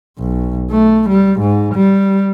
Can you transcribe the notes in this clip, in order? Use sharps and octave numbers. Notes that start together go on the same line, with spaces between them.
B1
A3
G3
G#2
G3